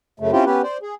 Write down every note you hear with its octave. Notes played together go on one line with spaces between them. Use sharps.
F#2 C#3 A3
C4 C#4 E4 F4 G4
B3 C#4 G4 B4
C5 D5
G#4